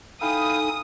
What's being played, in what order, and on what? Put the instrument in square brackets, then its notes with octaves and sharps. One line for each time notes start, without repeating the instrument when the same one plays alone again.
[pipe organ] D#4 A4 G#5 [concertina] E4 F5 G5 [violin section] D#6